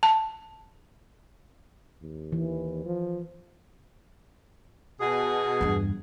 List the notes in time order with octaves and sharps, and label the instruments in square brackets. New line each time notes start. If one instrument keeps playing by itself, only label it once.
[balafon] A5
[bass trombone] D#2
[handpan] E3
[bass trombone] F3
[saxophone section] B2 G#4
[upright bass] E2 G2